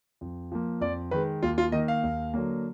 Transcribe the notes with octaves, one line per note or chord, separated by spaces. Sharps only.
F2
F3 A#3
F2 D5
D#3 G#3 B4
D#2 F4
F4
D#3 A#3 D#5
F5
D#2
D3 F#3 A#3